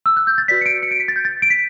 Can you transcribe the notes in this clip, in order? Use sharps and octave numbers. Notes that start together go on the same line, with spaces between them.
E6
F#6
G6
A6
F#4 B4 D5 B6
C#7
D7
C#7
D7
B6
A6
G6
A6
D7
B6